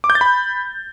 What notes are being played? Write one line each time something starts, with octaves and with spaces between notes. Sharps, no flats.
D6
G6
A6
B5